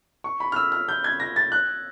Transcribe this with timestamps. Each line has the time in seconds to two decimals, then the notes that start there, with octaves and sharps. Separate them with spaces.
0.24 C#6
0.40 B5
0.52 F6
0.56 E6
0.72 F6
0.88 G6
1.04 G#6
1.20 A#6
1.36 A6
1.52 F#6